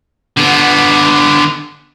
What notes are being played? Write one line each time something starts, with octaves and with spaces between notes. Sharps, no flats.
D3 B3